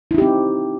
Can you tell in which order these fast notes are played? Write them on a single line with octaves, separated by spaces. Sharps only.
E4 D#4 G4 C4